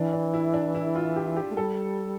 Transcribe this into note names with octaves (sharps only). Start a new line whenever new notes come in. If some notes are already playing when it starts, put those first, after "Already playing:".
Already playing: E3 D4
D4
E4
D4
E4
F4
G4
G4
A3
G3 A4